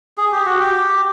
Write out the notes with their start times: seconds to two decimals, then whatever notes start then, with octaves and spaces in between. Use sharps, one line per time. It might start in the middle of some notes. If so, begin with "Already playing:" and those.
0.18 G#4
0.32 G4
0.46 F#4
0.60 G4